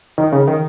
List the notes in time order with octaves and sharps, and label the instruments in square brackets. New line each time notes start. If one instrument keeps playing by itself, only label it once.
[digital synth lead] D#3
C#3
D#3